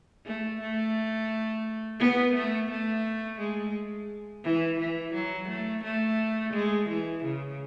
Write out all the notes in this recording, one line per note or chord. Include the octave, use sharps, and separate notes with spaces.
A3
A3
B3
A3
A3
G#3
E3
E3
F#3
A3
A3
G#3
E3
C#3